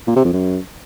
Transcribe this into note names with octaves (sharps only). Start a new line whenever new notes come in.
A#2
C3
F2
F#2